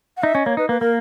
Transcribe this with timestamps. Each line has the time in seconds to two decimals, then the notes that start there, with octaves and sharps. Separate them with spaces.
0.17 F#5
0.23 D#4 E5
0.35 C#4 D#5
0.46 A#3 C#5
0.57 D#4 B4
0.69 A#3 B4
0.80 A#3 A#4